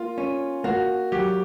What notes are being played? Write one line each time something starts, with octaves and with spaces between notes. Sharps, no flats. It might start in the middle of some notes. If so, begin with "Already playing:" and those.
Already playing: A#3 F4
C#4
A#3 F#4
F#3 G4